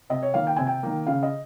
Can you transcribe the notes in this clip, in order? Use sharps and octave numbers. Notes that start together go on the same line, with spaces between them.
C3 D#5
C#5
D#3 A#3 F5
G5
C3 G#5
G5
D#3 A#3
C#3 F5
D#5